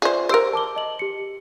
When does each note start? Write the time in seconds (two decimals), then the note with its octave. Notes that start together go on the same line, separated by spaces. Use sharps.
0.02 F4 G#4 C5 D5 E5
0.29 G4 A#4 C5 E6 D7
0.53 A5 D6 G7
0.76 D#5 F#7
0.99 G4 C#7